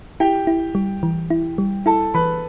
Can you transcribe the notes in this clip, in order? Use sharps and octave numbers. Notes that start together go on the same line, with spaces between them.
E4 G4 G5
E4
G3
E3
E4
G3
E4 A4 A5
E3 B4 B5